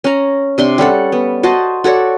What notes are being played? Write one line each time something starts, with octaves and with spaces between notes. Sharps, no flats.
C#4 A#5
C3 D4 C6
G3 C#4 A4 F#5
B3
F#4 C5 D#5 A5
F#4 A4 C#5 D5